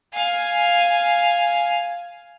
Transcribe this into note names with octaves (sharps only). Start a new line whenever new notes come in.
F5 G#5